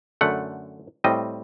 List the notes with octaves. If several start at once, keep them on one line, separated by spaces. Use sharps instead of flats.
F#2 D3 A3 F#5
A2 G3 C4 D#5